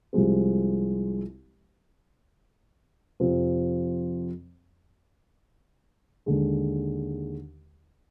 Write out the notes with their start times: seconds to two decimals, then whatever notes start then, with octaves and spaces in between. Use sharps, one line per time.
0.13 C2 C3 F3 G#3 C4
3.20 F2 C3 F3 C4
6.26 D#2 D3 G#3